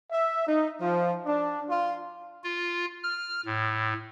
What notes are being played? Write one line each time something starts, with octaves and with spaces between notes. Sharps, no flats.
E5
D#4
F3
D4
F4
F4
F6
A2